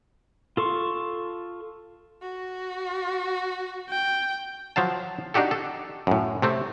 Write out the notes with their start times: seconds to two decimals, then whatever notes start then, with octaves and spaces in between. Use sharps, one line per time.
0.57 F4 A4 C6 C#6
2.22 F#4
3.90 G5
4.76 F3 F#3 F5 A5
5.34 D4 D#4 F#4 G4 A4
5.51 A4
6.07 F#2 A2
6.42 C3 A3 C4